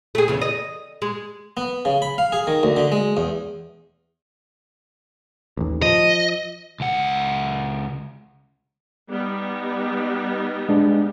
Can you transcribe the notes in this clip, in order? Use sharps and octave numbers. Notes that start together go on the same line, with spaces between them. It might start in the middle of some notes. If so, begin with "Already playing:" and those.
A3 G#4
E2 C#3
D#5
G#3
B3
C#3
B5
F5
G#4
D#3
D2
D3
G#3
E2
A1 D#2
F3 D#5
C#2 F#5
G3 B3 D#4
G#3 D4